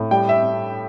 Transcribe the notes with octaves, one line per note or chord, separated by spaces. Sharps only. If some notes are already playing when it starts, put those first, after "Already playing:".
Already playing: A2
G3 G5
E5